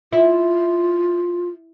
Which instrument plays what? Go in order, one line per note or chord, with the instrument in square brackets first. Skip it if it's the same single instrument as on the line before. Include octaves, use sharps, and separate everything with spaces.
[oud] E4 [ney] F4